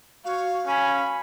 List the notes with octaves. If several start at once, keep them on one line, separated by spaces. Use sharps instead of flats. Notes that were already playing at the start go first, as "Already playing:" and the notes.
F#4 C#5 F5
C#4 G#5 B5